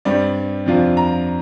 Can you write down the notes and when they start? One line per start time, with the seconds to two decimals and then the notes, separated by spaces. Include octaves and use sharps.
0.05 G2 G3 C4 D5
0.66 F2 C3 F3 D4 F4
0.97 A#5